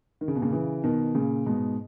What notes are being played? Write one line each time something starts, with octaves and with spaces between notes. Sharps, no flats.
D#3
C#3
B2
A#2 C#3
C#3 E3
B2 D#3
A#2 C#3
G#2 B2